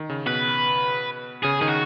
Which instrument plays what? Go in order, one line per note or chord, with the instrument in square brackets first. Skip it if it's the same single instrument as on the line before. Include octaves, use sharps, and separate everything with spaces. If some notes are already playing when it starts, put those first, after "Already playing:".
Already playing: [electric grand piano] D#3
C#3
[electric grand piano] B2 [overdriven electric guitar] B4
[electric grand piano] C#3 [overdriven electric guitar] G#4
[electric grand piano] D#3 [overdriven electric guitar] G#4
[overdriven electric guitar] F#4